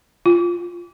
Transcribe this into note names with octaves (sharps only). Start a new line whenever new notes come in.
F4